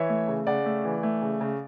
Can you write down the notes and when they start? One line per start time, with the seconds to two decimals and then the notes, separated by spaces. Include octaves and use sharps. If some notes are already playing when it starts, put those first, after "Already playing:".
Already playing: E3 C#5 E5
0.09 A3
0.28 C#3
0.47 C#3 D5 F#5
0.66 A3
0.85 E3
1.03 A3
1.22 C#3
1.41 C#3